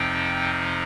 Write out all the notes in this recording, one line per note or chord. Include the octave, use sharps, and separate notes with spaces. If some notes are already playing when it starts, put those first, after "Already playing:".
Already playing: F2 C3 F3 C4 D#4 G5